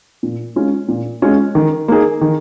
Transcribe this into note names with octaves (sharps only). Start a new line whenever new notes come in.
A#2
G#3 C#4 F4
A#2
G#3 C#4 F4
D#3
A#3 D#4 G#4
D#3